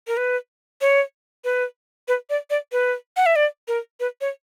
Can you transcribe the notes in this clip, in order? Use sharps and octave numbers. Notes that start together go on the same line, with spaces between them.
A#4
B4
C#5
B4
B4
D5
D5
B4
F#5
E5
D5
A#4
B4
C#5